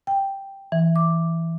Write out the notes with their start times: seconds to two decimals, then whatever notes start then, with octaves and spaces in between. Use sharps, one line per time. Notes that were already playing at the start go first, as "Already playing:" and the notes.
0.07 G5
0.72 E3
0.96 D6